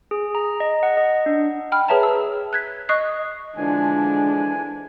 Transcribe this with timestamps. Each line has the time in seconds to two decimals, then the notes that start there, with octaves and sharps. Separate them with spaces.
0.11 G#4
0.35 A#5
0.60 D#5
0.83 F#5
0.97 D#5
1.26 D4
1.72 G5 B5 F6
1.88 G#4 B4 C#5 E5 A5 A#5
2.03 E6
2.53 F#6 G#6 B6
2.89 D#5 C#6 D#6 F#6 C7
3.57 D3 E3 F3 G#3 D4 G#5